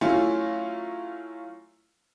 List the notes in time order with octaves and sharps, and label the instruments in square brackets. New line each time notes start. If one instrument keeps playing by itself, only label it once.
[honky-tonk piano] F#3 A3 C#4 E4 F4